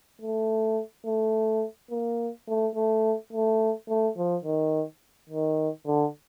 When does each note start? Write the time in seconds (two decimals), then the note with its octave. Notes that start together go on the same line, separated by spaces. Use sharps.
0.21 A3
1.06 A3
1.91 A#3
2.48 A3
2.75 A3
3.33 A3
3.89 A3
4.17 F3
4.44 D#3
5.29 D#3
5.87 D3